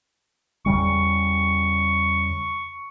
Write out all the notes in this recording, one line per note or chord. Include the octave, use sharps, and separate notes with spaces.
E2 C#3 G3 C#6